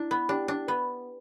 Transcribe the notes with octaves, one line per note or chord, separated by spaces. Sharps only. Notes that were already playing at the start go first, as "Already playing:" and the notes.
Already playing: D4 E4
B3
D4 G4 D5 G5
D4
B3 B4